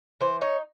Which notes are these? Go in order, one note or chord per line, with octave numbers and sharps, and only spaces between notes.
E3 C5
D#4 C#5